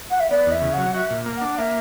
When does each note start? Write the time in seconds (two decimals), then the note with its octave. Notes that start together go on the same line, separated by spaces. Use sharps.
0.10 F#5
0.20 E5
0.30 B3 D5
0.46 E2
0.52 E5
0.62 C#3
0.73 F#3 F#5
0.94 F#4 E5
1.10 A#2
1.26 A#3
1.37 D4 F#5
1.58 A#3 E5